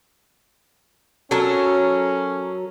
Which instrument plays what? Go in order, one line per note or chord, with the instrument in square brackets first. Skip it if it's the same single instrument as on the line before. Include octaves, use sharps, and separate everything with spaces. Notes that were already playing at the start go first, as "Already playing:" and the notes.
[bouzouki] F#3 A4 A#4 [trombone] C#4